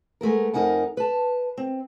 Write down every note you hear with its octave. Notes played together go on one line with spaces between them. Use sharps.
G#3 A3 B3 A#4
F2 D#4 A#4 F#5 G#5
B4 A5
C4